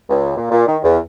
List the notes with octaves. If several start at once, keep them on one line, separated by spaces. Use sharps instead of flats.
C#2
A#2
A#2
D#3
E2